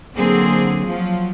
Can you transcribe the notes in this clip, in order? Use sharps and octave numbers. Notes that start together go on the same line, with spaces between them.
D3 F#3 A#3 C4 G#4
F3 F#3